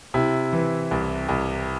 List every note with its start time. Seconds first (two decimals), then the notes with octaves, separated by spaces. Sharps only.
0.14 C3 E4
0.53 E3
0.91 C2
1.29 C2